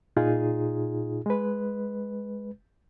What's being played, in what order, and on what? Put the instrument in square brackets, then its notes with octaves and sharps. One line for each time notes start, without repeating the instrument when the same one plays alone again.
[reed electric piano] A#2 D#4 F4 G#4
G#3 B4